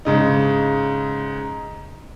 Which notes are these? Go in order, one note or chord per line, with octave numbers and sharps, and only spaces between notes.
G#2 C#3 D#4